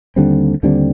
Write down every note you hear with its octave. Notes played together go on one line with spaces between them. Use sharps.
D#2 D3 G3 C4
D#2 D3 G3 C4